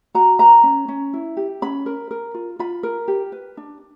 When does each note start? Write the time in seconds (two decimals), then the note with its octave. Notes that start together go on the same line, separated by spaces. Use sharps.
0.15 F#4 A#5
0.39 B4 A#5
0.63 C#4
0.88 C#4
1.13 E4
1.37 G4
1.62 C#4 B5
1.86 A#4
2.11 A#4
2.34 F4
2.59 F4 B5
2.83 A#4
3.08 G4
3.32 B4
3.57 D4